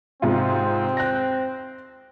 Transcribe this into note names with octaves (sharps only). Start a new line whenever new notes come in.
G#2 C3 C4 F4
F#6 A#6